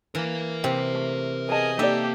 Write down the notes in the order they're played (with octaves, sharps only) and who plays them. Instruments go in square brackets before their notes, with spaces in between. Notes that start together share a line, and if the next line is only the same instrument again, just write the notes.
[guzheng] E3 [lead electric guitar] A#4 F5
[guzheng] C3 [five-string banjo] G4
[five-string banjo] A3
[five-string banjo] B3 A5 [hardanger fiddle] G#4 D#5
[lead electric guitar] A#3 [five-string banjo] D#4 D5 [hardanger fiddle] G4 [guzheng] A4 E5